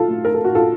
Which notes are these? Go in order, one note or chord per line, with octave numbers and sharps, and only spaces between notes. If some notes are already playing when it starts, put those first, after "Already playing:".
Already playing: F#3 F4 A4
A3
A#4
A4
F#4
F4 A4